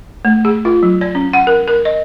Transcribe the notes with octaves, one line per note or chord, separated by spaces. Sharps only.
A3
G#4
F4
F#3
D5
C#4
F#5
A#4
A#4
D#5